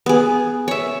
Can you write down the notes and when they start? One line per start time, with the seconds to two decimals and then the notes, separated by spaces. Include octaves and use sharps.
0.06 B3 G#4
0.68 C#5 E5